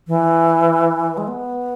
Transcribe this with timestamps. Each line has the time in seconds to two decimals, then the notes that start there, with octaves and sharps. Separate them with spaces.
0.08 E3
1.17 G#3
1.28 B3